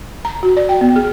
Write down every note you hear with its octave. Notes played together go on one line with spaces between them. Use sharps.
A#5
F#4
D5
G5
B3
G#4